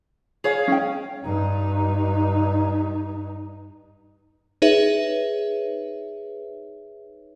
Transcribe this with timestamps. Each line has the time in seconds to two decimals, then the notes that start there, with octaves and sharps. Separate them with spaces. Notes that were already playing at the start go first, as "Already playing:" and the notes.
0.44 G#4 C#5 F5
0.68 C#4 G5
1.25 G2 D#4
4.62 D#4 G#4 B4 C#5 E5